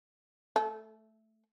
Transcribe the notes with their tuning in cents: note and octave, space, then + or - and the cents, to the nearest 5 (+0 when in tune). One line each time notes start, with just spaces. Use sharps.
A3 +0 A4 -30